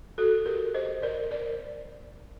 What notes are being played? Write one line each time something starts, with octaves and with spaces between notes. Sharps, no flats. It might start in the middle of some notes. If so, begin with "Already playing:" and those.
F#4 A4
G4 A#4
C5 D#5
A#4 D5
A#4 D5